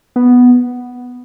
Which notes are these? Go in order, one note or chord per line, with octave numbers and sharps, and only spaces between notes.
B3